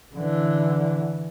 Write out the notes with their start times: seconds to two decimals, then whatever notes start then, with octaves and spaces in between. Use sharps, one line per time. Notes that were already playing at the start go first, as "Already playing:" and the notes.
0.15 D3 E3